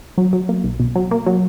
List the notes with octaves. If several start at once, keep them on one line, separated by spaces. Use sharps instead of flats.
F#3
F#3
A#3
B1
B2
F#3
A#3
F#3